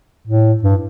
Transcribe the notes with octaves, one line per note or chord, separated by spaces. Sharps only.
A2
G2